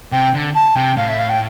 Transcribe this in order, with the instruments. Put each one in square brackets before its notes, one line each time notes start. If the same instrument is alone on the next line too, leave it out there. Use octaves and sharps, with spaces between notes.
[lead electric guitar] C3 [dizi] G5
[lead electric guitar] D3
[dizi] A5
[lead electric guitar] C3 [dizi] G5
[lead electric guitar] A2 [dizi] F5
[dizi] E5
F5
G5